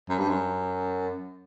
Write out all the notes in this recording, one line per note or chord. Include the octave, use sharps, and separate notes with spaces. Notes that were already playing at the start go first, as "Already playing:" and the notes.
F#2
G2
F#2